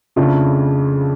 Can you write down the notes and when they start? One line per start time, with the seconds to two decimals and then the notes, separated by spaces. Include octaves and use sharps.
0.16 F2 C#3 F3 A3 D4